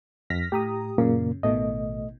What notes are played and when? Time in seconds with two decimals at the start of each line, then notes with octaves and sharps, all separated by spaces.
0.30 F2 F6 A#6 B6
0.52 A2 G4 A#5 D#6
0.98 F#2 A#2 C#3 A#3
1.43 A1 B2 D#3 A3 D#5